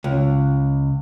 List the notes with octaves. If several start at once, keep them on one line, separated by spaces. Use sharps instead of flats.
C#2